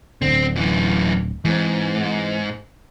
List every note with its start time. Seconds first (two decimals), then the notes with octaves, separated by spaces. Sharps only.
0.22 D1 A#1 D3 C4
0.56 F#2 E3
1.45 G#2 E3 C4